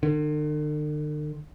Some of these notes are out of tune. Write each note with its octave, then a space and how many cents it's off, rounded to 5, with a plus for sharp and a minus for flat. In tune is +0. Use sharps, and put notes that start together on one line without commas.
D3 +45